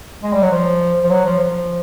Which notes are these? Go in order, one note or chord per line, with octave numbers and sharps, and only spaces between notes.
G#3
G3
F#3
F3
F3
F#3
F3
F3